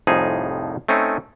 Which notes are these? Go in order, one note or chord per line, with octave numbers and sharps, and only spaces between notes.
C2 F2 A2 F3 D#4 G#4
A3 C4 C#4 D#4